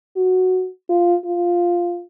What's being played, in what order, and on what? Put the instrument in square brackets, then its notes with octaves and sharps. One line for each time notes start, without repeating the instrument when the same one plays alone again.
[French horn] F#4
F4
F4